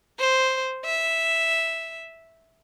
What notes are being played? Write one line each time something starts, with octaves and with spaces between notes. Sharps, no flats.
C5
E5